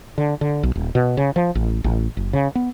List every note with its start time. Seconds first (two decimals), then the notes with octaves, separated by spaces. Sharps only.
0.18 D3
0.41 D3
0.63 B1
0.75 D#1
0.95 B2
1.17 C#3
1.36 F3
1.55 A1
1.84 A1
2.17 F#1
2.33 C#3
2.55 B3